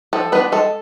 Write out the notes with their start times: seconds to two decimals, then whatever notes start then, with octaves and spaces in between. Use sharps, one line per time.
0.13 F3 A4
0.32 B3 D4 F4 B4
0.52 G#3 A4